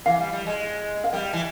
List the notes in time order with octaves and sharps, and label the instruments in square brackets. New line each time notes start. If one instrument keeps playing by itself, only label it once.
[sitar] E3 [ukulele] F5
[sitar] G3
G3
G#3
[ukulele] F5
[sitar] G3 [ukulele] G5
[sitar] E3